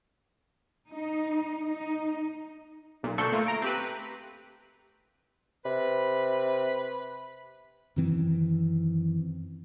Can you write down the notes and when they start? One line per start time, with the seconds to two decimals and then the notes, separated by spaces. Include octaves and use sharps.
0.93 D#4
1.71 D#4
3.03 B1 A#2
3.18 D2 A#2 D4 A4 C#6 G6
3.32 A3 A#3 F4
3.46 A#5 D7
3.62 C4 G4 B4
5.65 C3 B4
7.96 F#2 D#3 E3 C4